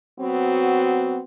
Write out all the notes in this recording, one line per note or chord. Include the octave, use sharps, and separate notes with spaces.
F#3 B3 C4 F#4